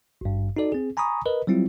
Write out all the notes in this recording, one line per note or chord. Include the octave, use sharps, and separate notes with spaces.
G#1 G2
D#4 F#4 A4 D5
C4 G#4
G#5 A#5 B5 C#6 D#6
A#4 B4 D#5
F#3 G3 C4 E4 F4